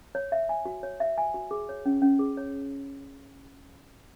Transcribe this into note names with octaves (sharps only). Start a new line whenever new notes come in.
C#5
E5
G#5
F#4
C#5
E5
G#5
F#4
G#4
C#5
C#4
C#4
G#4
C#5